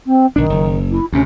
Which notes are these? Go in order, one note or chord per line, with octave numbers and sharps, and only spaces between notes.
C4
B1 D#3 D4
F#1
E4
D2 C3 C#4